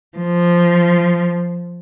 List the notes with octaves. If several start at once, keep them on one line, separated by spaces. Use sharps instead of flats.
F3